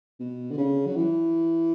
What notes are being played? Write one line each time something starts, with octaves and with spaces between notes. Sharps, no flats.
B2
D3
C#3
F#3
E3